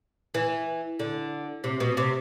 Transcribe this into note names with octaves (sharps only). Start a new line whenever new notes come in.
E3
D3
C3
B2
C3